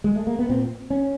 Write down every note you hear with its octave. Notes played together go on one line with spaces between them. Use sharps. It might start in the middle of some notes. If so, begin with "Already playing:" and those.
G#3
A3
A#3
B3
A#2 C4
C#4